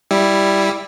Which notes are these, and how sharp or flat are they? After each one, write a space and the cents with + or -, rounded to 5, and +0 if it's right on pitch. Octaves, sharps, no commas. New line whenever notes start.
G3 +0 E4 +0